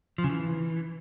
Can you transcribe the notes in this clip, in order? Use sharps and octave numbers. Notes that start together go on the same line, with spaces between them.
F3
C#3
E3